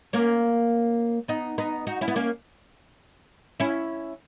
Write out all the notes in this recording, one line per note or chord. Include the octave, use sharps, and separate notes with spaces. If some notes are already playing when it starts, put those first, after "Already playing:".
A#3 C#4
B3 D#4
B3 D#4
D#4 F#4
C#4 E4
B3
A#3 C#4
C#4 E4